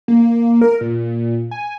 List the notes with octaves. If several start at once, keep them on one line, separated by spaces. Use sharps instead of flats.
A#3
A#4
A#2
G#5